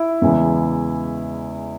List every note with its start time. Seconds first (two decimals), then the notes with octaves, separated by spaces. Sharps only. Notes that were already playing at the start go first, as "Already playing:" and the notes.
Already playing: E4
0.22 E2 C#3 E3 G#3 C#4